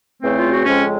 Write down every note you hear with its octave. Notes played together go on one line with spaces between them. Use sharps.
E2 C#3 E3 A3 C4
F4
F#4
F2 C#3 F3 G#3 C4 C#4